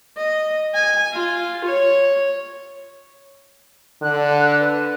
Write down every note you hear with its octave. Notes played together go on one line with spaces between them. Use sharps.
D#5
G#5
F4
C#5
D3 F#6
B4